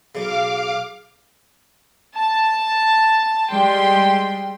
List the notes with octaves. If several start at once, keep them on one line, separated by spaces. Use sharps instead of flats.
B1 C#3 F5 D6
A5
G3 G#3 G5 C6